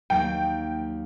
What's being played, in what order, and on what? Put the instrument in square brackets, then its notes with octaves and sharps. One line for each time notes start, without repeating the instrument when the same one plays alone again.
[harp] D#2 F#3 A#3 [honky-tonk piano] G5